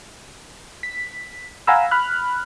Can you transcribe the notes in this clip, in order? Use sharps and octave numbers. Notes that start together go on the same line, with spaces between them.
B6
F5 F#5 G#5 A#5 B5 E6
B5 F6 F#6